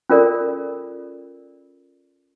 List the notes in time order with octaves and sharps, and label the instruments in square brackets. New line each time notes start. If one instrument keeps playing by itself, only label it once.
[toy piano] C#4 F4 A4 A#4 D5